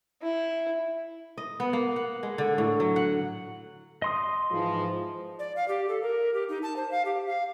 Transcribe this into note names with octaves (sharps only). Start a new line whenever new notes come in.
E4
D#5
B3
A#3
F#5
G#3
D3
A2
F#3
F#5
D#5 C6 D#6
G#2 E3 F3
D5
F5
G4
A4
A#4
G4
D#4
A5
C5
F5
G4
F5